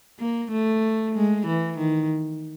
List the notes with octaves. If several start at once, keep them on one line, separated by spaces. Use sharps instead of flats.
A#3
A3
G#3
E3
D#3